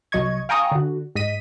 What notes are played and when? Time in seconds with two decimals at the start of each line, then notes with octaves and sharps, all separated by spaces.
0.12 C2 F#3 D#5 C#6 G#6
0.49 F5 G5 G#5 A#5 C#6 D#6
0.72 D3 F#4
1.15 G#2 D#5 B6 D#7